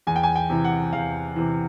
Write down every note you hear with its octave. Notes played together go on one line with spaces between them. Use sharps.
E2 G#5
G5
G#5
G5
C3 E3
F#5
E2 F5
C3 E3